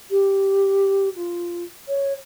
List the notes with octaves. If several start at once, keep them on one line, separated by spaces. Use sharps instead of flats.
G4
F4
C#5